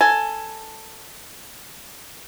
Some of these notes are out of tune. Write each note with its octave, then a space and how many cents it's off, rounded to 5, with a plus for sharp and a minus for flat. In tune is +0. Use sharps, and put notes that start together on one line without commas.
A4 +10 G#5 +5